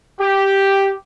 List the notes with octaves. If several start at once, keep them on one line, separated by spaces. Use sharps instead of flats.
G4